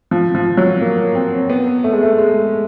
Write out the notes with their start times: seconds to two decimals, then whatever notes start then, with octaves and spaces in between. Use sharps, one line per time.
0.11 F3
0.35 F3
0.57 F#3
0.81 A#3
1.15 C4
1.50 B3
1.84 A3
1.93 G#3
2.03 A3
2.18 G#3